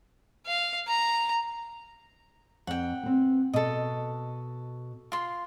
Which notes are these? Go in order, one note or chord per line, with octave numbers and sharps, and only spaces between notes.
F5
A#5
F2 F#5 G5
B3 C4
B2 A4 D#5
F4 C6